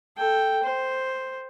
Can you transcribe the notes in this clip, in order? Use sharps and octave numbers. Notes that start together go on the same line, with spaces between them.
A4 G5
C5